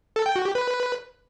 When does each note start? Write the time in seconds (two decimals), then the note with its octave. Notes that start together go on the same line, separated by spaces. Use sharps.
0.16 A4
0.26 G5
0.36 F#4
0.45 G4
0.55 B4